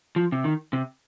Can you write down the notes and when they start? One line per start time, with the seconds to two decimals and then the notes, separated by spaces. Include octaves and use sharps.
0.16 F3
0.32 C3
0.44 D#3
0.73 C3